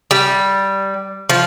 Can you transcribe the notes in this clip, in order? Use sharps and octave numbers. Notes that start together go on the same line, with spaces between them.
G3
F3